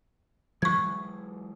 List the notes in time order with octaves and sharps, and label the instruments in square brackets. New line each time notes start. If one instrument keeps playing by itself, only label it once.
[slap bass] E3 F#3 G#3 [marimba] C#6 G#6